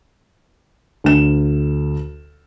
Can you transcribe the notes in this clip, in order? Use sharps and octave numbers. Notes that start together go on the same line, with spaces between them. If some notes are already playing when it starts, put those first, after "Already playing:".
D2 E7